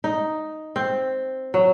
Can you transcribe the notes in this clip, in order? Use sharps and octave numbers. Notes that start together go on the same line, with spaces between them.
D#4
C4
F#3